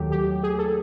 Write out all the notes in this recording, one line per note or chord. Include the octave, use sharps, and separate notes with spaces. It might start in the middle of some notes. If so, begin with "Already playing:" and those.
Already playing: D#2 D#3 F#3 A3 G4
G4
G#4
A4